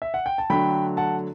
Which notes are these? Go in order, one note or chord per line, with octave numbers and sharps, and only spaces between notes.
E5
F#5
G5
A5
D3 F#3 A3 G5 B5
F#5 A5